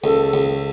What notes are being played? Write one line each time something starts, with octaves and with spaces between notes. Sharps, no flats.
C#2 A4
C#2